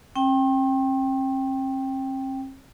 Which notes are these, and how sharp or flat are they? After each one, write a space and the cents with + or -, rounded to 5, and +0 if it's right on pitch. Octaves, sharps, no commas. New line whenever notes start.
C4 +45 G5 +0